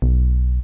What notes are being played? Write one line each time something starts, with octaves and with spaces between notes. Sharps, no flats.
B1